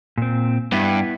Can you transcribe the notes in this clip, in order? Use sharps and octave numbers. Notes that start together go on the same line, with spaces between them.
A#2 C4
G2 B3 E4